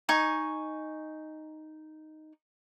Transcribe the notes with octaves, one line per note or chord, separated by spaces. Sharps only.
D#4 G#5 C#6